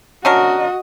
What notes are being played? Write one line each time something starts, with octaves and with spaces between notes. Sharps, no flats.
C#4 D4 F#4 A#4 D#5